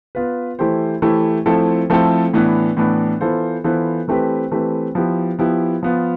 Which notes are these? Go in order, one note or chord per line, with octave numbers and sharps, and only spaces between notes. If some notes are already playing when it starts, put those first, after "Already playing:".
B3 F4 B4
E3 A3 E4 G4 C5
E3 A3 E4 G4 C5
F3 A3 C4 E4 A4
F3 A3 C4 E4 A4
A2 E3 B3 D4
A2 E3 B3 D4
E3 B3 F4 A4 C5
E3 B3 F4 A4 C5
E3 A3 C4 G4 B4
E3 A3 C4 G4 B4
F3 B3 E4 G4
F3 B3 E4 G4
F3 B3 F4